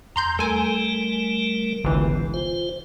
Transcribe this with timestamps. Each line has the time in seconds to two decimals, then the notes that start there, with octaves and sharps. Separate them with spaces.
0.16 E2 A#5 C6 G6
0.39 G3 A3 A4 A#4 G#5
1.84 G1 C#2 C3 E3
2.34 F4 C5